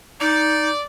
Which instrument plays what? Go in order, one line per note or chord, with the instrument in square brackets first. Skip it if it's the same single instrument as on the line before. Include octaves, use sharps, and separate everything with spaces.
[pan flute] D#4 [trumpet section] D5